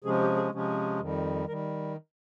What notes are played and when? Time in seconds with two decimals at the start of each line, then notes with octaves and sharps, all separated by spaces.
0.04 C3 F3 G#3 C#4 G#4
0.21 G4
0.36 G#4
0.53 C3 F3 G#3 C#4
1.00 F2 D#3 G3
1.48 D#3 G3 A#4